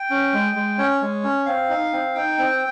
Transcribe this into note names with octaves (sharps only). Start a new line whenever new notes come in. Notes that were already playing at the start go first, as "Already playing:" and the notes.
Already playing: G5
C#4
G#3
G#3
C#4 C#5
G#3
C#4
C4 F5
D#4
C4
D#4 G5
C4